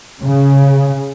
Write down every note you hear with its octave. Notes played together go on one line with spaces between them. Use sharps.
C#3